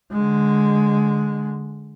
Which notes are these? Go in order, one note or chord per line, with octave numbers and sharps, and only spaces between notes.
D3 G#3